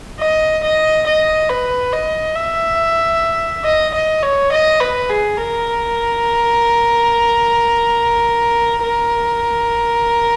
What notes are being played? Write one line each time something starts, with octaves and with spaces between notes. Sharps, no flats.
D#5
D#5
D#5
B4
D#5
E5
D#5
D#5
C#5
D#5
B4
G#4
A#4
A#4